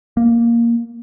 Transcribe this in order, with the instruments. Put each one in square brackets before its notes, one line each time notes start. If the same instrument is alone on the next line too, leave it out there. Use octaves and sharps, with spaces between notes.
[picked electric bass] A#3